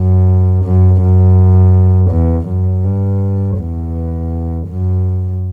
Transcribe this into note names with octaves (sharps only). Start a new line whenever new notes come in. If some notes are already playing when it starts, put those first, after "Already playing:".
Already playing: F#2
F#2
F#2
E2
F#2
G2
E2
F#2